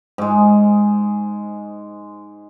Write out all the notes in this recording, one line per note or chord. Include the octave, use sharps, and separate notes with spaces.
G#2 G#3